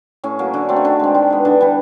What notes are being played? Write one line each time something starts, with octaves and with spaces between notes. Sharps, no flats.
A2 C#4
F#3 A#3
D3
F#3 A3 C4
C#4
D3 D#3 D4
G#3 C4
D#3
G#3 B3
D3 E3 D4
G3 B3